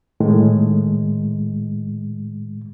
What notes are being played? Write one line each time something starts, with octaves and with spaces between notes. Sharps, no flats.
A2 D#3 G#3